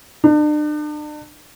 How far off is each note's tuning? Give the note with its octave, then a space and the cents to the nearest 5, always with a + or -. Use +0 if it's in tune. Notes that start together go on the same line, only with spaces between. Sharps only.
D4 +40